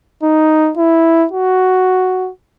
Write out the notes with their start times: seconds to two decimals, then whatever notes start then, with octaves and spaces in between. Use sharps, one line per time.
0.23 D#4
0.77 E4
1.32 F#4